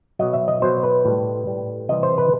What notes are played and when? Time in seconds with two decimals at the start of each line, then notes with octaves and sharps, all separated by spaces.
0.19 B2 F#3 D#5
0.33 E5
0.48 D#5
0.62 B2 F#3 C5
0.83 B4
1.05 A2 G3
1.47 A2 G3
1.89 C3 E3 G3 D#5
2.03 C5
2.18 B4